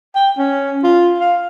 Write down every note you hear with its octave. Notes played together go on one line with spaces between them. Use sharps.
G5
C#4
F4
F5